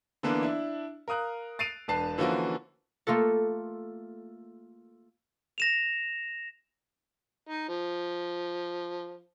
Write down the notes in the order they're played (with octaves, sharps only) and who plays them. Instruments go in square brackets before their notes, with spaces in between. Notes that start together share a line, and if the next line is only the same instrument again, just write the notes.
[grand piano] D3 E3 A#3 B3 D4
D4 E4
A#4 F5 D#6 F#6
A6 C7 D7 D#7 F7
E1 D4 B4 A5 C7
D3 E3 F3 A#3 C#4 F#4
[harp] A3 A#3 F4 A4
[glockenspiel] A#6 E7 F7
[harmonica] D#4
F3